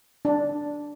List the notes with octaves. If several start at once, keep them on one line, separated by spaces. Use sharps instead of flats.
D4